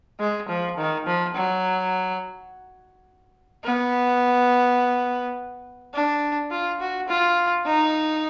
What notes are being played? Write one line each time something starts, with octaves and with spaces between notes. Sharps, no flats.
G#3
F3
D#3
F3
F#3
B3
D4
F4
F#4
F4
D#4